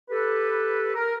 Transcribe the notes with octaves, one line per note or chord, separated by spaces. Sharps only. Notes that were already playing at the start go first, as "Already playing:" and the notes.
G4 A4 B4
A#4